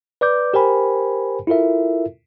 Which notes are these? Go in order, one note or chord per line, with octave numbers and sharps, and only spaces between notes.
B4 D5 D6 G6
G4 A#4 C5 G5 G#5 B5
E4 F4 A4 A#4 E5